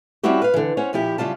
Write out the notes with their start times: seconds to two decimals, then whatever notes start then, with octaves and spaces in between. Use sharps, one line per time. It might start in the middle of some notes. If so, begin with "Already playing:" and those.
0.23 G3 C4 C#4 E4 F#4 G4
0.42 B4 F5
0.54 D3 E3
0.77 C#4 C5 C#5 F#5
0.93 A#2 F3 E4 G4
1.18 F#2 C#3 G3 F4 A5